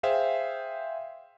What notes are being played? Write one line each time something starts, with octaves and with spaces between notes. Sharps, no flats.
G#4 C5 E5 F5 G5